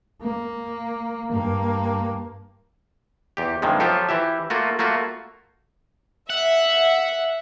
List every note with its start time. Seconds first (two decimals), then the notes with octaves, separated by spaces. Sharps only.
0.22 A#3
1.31 G2 A#3
3.37 E2 G4
3.62 G2 C3 D#3 F3 G#3
3.80 F3 F#3 F4 G4 A4
4.09 E3 G4 E5
4.50 A3 A#3 F4 F#4
4.79 A3 A#3 F4 F#4
6.30 E5 F#5